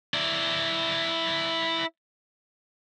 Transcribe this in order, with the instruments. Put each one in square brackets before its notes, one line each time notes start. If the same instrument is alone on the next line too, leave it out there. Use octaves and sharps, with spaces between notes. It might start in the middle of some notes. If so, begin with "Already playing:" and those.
[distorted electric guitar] E4 D5